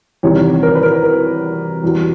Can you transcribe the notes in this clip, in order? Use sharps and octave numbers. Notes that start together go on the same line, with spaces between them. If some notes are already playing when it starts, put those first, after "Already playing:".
E2 C3 D#3 G3 C#5
A#4
B4
A#4
A#4
E2 B2 G3